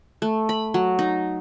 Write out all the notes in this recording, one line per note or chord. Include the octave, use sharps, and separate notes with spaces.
A3
B5
F#3
D#4